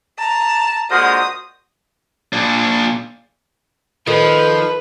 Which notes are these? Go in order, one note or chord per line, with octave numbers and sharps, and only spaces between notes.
A5 A#5
A#2 D3 G#3 F#4 C5 D#5 D#6 F6
A#2 D4
D#3 F3 A4 B4